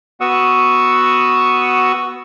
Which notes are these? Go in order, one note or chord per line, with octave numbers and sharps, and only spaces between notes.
B3 F#4 F#5 C#6 D#6 E6